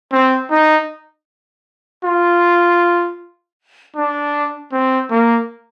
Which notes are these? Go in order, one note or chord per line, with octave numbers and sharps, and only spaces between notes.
C4
D#4
F4
D4
C4
A#3